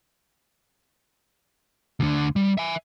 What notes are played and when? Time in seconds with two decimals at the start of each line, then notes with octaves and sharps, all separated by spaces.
2.00 D2 D3
2.36 G3
2.57 E5 G#5